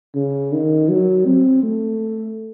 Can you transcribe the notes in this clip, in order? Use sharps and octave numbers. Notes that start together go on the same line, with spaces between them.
C#3
D#3
F#3
C4
A3